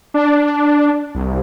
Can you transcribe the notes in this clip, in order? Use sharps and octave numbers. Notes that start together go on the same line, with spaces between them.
D4
C2